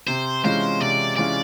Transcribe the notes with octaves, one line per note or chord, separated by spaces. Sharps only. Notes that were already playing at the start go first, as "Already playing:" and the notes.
C3 C5
E3 G#3 C#4 F4 C5
C3 D5
E3 G#3 C#4 F4 D5